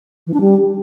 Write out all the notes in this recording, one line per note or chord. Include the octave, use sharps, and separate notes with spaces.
E3
D4
G3